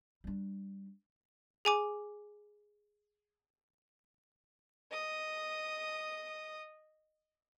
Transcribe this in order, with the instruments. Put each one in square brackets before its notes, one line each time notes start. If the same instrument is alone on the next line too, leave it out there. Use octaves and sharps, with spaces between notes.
[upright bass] G3 D4
[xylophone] G#4 G#5 D6
[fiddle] D#5 D#6